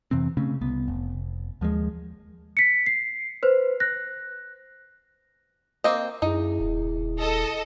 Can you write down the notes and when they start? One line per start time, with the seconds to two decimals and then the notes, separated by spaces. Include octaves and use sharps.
0.11 F2 C3 E3 C4
0.37 C#3 A3 C4 C#4
0.61 C2 B3
0.88 F1
1.61 D#2 F3 F#3 G#3
2.57 B6 C#7
2.86 C7
3.43 B4 C5
3.80 F#6 A#6
5.84 A#3 C4 D#5
6.22 F#2 D#4 E4 G#4
6.60 D#1
7.19 A4 D#5